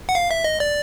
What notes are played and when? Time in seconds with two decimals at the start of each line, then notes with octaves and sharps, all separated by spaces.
0.09 F#5
0.15 F5
0.31 E5
0.44 D#5
0.60 D5